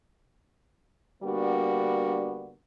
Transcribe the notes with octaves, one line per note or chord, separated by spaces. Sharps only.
D3 G3 A#3 B3 D4 F#4